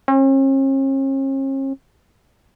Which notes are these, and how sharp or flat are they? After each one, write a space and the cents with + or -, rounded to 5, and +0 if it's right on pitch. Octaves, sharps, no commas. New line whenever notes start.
C#4 -45